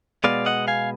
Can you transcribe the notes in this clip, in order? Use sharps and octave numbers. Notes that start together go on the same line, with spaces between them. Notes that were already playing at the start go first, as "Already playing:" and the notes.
B2 G#3 B3 D5 F5
D#5 F#5
F5 G#5